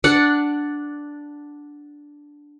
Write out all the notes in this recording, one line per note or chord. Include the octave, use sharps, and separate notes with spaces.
D4 F#5